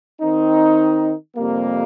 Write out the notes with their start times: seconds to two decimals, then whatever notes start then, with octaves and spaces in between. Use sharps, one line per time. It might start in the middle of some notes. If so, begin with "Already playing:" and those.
0.21 D#3 C4 D#4
1.36 F2 C3 G3 A#3